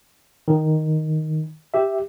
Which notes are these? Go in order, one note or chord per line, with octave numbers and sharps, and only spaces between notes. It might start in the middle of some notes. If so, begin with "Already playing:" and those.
D#3
G4 E5